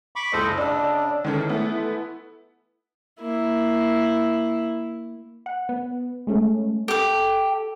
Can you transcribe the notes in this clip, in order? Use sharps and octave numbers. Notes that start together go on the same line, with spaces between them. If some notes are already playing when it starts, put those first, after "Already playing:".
B5 C#6 D6
F#1 C#2 A4 C5 D#5
C#3 D4 D5 D#5 E6
D#3 E3 G#3 C#4 A4
A3 B3 E4
A#3 E4
F#5
B3
G#3 A3 C#4
G4 A4 D6